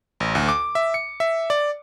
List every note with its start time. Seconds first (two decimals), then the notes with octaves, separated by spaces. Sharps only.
0.20 A1
0.35 D2
0.49 D6
0.75 E5
0.94 C#7
1.20 E5
1.50 D5